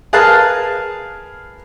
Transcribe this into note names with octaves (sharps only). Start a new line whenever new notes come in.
G#4 A#4 B4 F5 A5 F#6